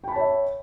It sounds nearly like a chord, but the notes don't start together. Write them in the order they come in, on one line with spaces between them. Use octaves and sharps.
G5 B5 A5 C#5 E5